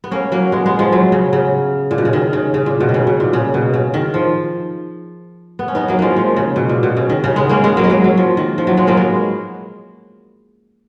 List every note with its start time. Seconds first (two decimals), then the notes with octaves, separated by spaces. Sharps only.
0.04 B3
0.11 A#3 C#4
0.32 F#3 A#3
0.52 G#3 B3
0.66 G#3 B3
0.79 F3 G#3
0.92 F#3
1.12 C#3
1.33 C#3
1.91 A#2
1.98 B2
2.05 C#3
2.13 D#3
2.33 C#3
2.54 C#3
2.66 A#2
2.80 B2
2.89 D#3
2.94 C#3
3.07 B2
3.20 A#2
3.33 C#3
3.54 B2
3.74 C#3
3.94 D#3
4.14 F3
5.59 B3
5.68 C#4
5.75 B3 D#4
5.88 F#3 A#3
5.99 F3 G#3 A#3
6.16 F3
6.36 C#3
6.56 B2
6.69 A#2
6.83 B2
6.97 C#3
7.10 D#3
7.24 C#3
7.36 G#3 B3
7.49 A#3 C#4
7.64 G#3 B3
7.77 F#3 A#3
7.84 G#3
7.90 F#3 A#3
8.04 F#3
8.17 F3
8.37 D#3
8.58 F3
8.67 F#3
8.77 F3 G#3
8.87 F#3 A#3
8.97 G#3 B3